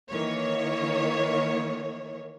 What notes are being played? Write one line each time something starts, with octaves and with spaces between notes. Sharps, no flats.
D#3 E3 A#3 C#5